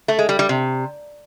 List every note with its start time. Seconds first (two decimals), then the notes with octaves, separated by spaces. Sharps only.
0.08 A3
0.19 G#3
0.29 G3
0.39 G3
0.49 C3